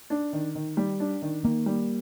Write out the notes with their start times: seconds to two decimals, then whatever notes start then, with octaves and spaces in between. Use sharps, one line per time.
0.10 D4
0.33 D#3
0.55 D#3
0.77 G3
1.00 D4
1.22 D#3
1.44 D#3 A#3
1.66 G3